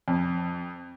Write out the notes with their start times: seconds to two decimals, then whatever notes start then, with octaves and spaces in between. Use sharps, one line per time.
0.08 F2